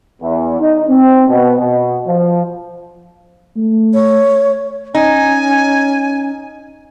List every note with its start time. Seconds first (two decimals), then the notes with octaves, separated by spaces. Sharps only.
0.21 E2
0.60 D#4
0.88 C4
1.28 B2
1.59 B2
2.07 F3
3.57 A3
3.94 C#5
4.95 C#4 D#4 G#5